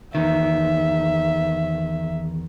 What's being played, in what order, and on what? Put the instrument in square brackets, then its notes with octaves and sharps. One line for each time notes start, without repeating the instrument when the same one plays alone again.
[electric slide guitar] E2 D#3 [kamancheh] E5